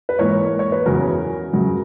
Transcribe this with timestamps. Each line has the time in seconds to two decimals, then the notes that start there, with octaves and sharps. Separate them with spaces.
0.09 B4
0.19 G#2 E3 A#3 A#4 C#5
0.59 C#5
0.72 B4
0.86 E2 C#3 F#3 A#4
1.53 F#2 C#3 F#3